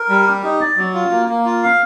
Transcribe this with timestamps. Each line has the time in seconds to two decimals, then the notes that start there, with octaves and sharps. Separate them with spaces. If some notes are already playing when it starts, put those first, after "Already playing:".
Already playing: A#4
0.09 G3
0.26 G4
0.43 D#4
0.61 D5
0.77 F#3
0.94 F4
1.11 A#3
1.29 A#3
1.45 F4
1.63 F5